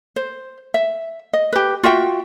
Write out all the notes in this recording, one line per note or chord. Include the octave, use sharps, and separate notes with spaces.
C5
E5
D#5
G4 B4
F4 F#4 E5 G5